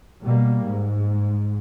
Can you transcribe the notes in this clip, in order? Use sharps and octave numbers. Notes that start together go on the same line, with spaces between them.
B2 G3 A#3
G#2